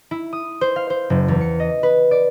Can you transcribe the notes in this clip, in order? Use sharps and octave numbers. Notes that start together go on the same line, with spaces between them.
E4
D#6
C5
F5
C5
F#1
E2
C#7
D#5
B4
D5